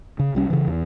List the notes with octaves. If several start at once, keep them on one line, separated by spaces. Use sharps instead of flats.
C#3
C2 G3 C#4
C#3 E3
E2